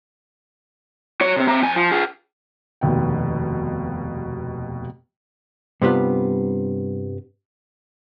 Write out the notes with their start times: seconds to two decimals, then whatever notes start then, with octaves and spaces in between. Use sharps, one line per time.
1.21 F#4 C#5
1.36 C3 C4
1.48 C4 A#5
1.63 F2 G#5
1.76 F3
1.92 F4 G#4
2.81 F1 D#2 B2 G5
5.82 G2 C3 G3 B3 F4